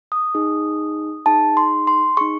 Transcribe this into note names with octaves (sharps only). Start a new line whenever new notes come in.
D#6
D#4 G#4
D#4 G#4 A5
C6
C6
D#4 G#4 C#6